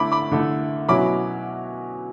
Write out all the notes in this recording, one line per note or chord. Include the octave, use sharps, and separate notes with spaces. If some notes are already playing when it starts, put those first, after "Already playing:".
Already playing: D3 A3 E4 B5 D6
B5 D6
D3 A3 E4
B2 F#3 C#4 E4 B5 D6